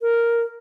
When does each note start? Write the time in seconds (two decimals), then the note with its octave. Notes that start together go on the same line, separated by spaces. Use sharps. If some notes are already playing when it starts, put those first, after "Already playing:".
0.02 A#4